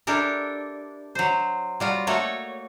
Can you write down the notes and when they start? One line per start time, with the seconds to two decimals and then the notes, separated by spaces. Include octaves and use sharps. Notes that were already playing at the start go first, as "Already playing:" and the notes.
0.07 D4 E4 G4 A4 A#4
1.15 F#3 C5
1.80 G3 F4 F#4
2.07 A3 A#3 F#4 C#5